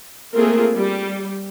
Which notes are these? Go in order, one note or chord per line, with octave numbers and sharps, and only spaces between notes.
A3 A#3 C4 F4 G#4 A#4
G3